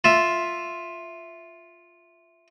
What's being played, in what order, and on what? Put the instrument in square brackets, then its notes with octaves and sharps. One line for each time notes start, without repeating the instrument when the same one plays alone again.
[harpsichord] F4 E5